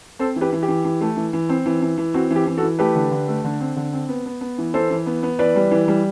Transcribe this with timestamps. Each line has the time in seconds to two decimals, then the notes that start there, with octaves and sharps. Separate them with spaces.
0.19 C4 A4 C5
0.36 E3
0.41 G4 B4
0.53 E3
0.63 G4
0.68 E3
0.85 E3
1.01 A3
1.17 E3
1.33 E3
1.49 C4
1.66 E3
1.82 E3
1.98 E3
2.14 C4 F#4
2.31 E3
2.36 G4
2.47 E3
2.58 F#4 A4
2.63 E3
2.79 A3 G4 B4
2.95 D3
3.11 D3
3.28 A3
3.44 D3
3.60 C4
3.76 D3
3.93 C4
4.09 B3
4.26 B3
4.41 B3
4.58 E3
4.74 E3 A4 C5
4.91 E3
5.06 B3
5.23 B3
5.39 E3 B4 D5
5.56 G3
5.71 E3
5.88 G3